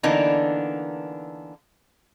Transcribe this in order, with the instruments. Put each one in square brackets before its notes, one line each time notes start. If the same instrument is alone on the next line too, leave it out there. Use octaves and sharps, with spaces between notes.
[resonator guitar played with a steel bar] D3 E3 A#3 B3 D4 D#4